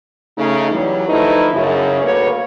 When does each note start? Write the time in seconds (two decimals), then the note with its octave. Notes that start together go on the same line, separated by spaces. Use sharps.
0.38 C#3 A3 D#4
0.71 E3 F#3 G3
1.08 D3 F3 A3 D#4 E4 B4
1.53 F#2 C#3
2.02 D2 A3 A#3 F#4 B4 C#5